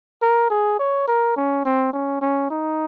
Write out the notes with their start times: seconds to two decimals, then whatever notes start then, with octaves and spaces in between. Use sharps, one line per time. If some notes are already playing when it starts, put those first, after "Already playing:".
0.22 A#4
0.50 G#4
0.79 C#5
1.07 A#4
1.36 C#4
1.65 C4
1.93 C#4
2.21 C#4
2.50 D#4